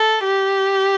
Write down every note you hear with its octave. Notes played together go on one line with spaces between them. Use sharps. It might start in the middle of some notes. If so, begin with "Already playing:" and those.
Already playing: A4
G4